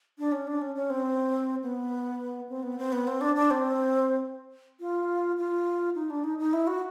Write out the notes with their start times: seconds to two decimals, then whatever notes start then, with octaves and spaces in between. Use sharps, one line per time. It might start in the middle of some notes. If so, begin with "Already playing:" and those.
0.18 D4
0.32 C#4
0.47 D4
0.61 C#4
0.75 C#4
0.90 C4
1.63 B3
2.49 C4
2.63 B3
2.78 C4
2.92 B3
3.07 C4
3.21 D4
3.36 D4
3.50 C4
4.80 F4
5.38 F4
5.95 D#4
6.10 D4
6.24 D#4
6.39 D#4
6.53 E4
6.67 F#4